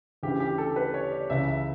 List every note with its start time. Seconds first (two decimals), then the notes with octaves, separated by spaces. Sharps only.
0.23 D2 C#3 E3 G4
0.40 G4
0.58 A4
0.76 B4
0.94 C#5
1.12 D5
1.30 C#2 C#3 E3 E5
1.48 E5